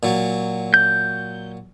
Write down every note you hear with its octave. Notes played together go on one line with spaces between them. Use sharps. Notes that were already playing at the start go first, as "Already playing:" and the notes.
A#2 F#3
G6